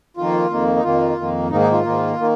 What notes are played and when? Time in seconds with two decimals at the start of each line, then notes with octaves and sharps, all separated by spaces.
0.17 F2 D#3 A#3 F4
0.50 F2 D#3 A#3
0.76 D#4
0.83 F2 D#3 A#3 F4
1.17 F2 D#3 A#3
1.50 G#2 D#3 A#3 D#4
1.60 D#4
1.72 F4
1.83 G#2 D#3 A#3
2.18 D#3 A#3